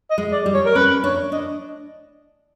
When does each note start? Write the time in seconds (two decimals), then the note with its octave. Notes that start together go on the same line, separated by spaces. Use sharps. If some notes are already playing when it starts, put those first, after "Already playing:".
0.10 D#5
0.18 G#3
0.32 D5
0.46 G3
0.54 C#5
0.66 A#4
0.76 C#4 B4
1.04 D4 C#5
1.32 D4 D#5